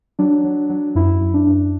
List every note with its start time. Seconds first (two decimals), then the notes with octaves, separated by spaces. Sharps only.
0.19 F#3 D4
0.45 F#3
0.70 F#3
0.95 F#2 E4
1.21 F#2
1.34 D4
1.47 F#2